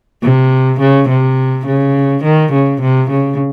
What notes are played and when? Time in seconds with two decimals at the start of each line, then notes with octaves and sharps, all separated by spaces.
0.23 C3
0.80 C#3
1.09 C3
1.66 C#3
2.24 D#3
2.53 C#3
2.81 C3
3.10 C#3